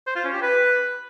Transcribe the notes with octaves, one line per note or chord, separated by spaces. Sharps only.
C5
F4
C#4
G4
B4